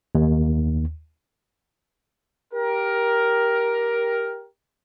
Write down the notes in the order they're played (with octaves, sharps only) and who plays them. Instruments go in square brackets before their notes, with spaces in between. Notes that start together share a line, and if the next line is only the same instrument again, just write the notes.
[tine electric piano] D#2
[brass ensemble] G4 A#4